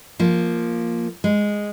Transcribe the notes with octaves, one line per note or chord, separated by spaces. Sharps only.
F3 A#3
G#3